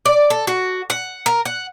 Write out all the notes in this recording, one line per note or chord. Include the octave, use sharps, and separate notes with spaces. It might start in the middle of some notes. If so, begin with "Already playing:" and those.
D5
A4
F#4
F#5
A#4
F#5